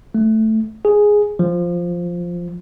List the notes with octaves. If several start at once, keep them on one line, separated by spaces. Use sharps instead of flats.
A3
G#4
F3